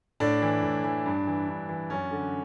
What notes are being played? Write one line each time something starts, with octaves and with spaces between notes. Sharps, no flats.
A2 D4
E3
A2
E3
G2
E3
G2
E3
F#2 C#4
D3